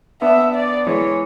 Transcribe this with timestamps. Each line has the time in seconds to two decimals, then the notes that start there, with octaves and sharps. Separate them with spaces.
0.22 B3 D4 E5
0.55 D5
0.87 E3 G#3 C#5